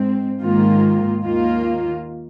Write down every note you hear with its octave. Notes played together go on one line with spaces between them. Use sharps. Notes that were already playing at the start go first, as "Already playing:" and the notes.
Already playing: G#2 C4
G#2 D#3 A#3 F4
D#2 D#3 A#3 F4